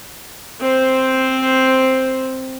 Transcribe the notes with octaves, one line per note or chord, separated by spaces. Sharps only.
C4 C5